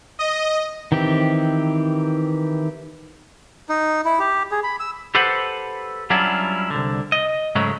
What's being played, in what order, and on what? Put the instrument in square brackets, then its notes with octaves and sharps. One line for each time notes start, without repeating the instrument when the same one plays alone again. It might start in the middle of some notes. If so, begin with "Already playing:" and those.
[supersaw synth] D#5
[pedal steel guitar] D#3 E3 C4 G4
[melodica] D#4
E4
G4
G#4
B5
E6
[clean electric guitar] G4 A4 B4 C5 F#5
F#3 G3 C#4 D4 E4 F4
C2 D3
D#5
G#2 C#3 F#3 G#3 A3